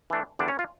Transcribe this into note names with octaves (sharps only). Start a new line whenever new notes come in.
E3 A3 D4
E2 D3 G3 D4 D5
C#4 C#5
F4